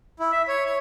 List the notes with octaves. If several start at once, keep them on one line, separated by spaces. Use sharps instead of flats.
E4
E5
C#5
C#5